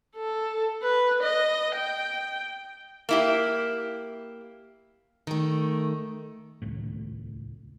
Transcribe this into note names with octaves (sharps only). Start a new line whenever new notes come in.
A4
B4
D#5
G5
A#3 E4 G4
D#3 A3
D#1 C#2 A2